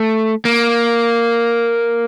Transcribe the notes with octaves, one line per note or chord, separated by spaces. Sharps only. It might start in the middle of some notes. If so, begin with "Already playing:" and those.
Already playing: A3
A#3